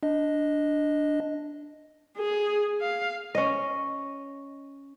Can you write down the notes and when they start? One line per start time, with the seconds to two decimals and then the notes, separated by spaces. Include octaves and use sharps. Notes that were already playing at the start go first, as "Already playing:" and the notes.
0.03 D4 D#5
2.18 G#4
2.81 F5
3.35 C#4 D#5